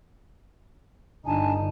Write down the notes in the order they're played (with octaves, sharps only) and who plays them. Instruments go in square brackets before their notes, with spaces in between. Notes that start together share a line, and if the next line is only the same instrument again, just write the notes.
[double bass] G1 D#4 [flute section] D4 G#5 A5